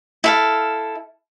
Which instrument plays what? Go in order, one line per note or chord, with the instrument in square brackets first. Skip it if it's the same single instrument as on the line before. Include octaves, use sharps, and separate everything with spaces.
[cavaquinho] E4 A4 F5